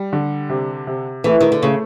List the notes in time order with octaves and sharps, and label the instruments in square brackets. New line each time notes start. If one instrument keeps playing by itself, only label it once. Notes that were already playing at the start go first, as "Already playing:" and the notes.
Already playing: [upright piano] G3
D3
C3
C3
[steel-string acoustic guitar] E3 [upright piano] A3
[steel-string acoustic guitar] D#3
D3
[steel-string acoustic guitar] C#3 [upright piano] A3